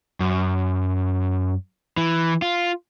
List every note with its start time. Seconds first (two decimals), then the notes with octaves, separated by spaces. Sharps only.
0.20 F#2
1.97 E3
2.42 F4